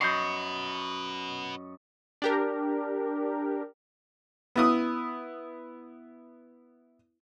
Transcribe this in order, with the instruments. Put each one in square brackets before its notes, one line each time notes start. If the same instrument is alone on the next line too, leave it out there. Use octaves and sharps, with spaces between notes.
[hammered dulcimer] F#2 D#5 C#6 [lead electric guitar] F#4 B4 [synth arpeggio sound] G6 C7
[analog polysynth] D4 G4 A#4
[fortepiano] B3 E4 D#6